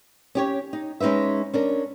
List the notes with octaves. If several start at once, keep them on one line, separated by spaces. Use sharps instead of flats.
C#4 G4 C#5
D#4
G#3 C#4 D#4 B4 E5
C#4 D4 A#4